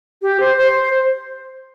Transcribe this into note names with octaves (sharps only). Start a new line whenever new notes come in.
G4
C5
C5